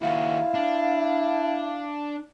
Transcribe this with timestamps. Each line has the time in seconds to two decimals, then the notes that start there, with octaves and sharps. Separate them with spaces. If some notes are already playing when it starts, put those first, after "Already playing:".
0.02 D#2 E4 F#4 F5
0.54 D4